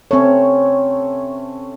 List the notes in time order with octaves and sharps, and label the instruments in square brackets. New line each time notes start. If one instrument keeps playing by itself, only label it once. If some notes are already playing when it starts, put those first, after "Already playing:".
[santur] A3 C#4 [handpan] C4 C#5